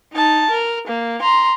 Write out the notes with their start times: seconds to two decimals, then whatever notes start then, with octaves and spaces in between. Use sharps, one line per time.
0.14 D#4 A5
0.51 A#4
0.87 A#3
1.22 A#5 C6